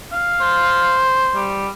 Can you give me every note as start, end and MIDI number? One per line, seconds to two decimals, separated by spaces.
0.13 1.08 77
0.41 1.58 72
1.36 1.68 55